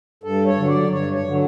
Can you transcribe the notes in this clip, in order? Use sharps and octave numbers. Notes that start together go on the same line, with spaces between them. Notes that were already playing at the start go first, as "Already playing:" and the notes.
G2 A4
C#5
D3 F#3
D5
G2 C#5
C#5
D3 F#3